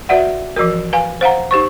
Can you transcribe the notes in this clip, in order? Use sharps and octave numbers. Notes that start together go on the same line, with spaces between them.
F#4 B4 D5 E5 F#5
E3 F3 F#4 A#4
B4 F5 G#5
C5 F5 F#5 A#5
D#4 G4 C5 C#6